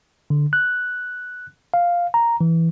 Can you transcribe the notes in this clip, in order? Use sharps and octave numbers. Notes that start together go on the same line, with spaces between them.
D3
F#6
F5
A#5
E3